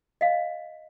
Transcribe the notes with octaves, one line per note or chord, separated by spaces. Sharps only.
D#5 F5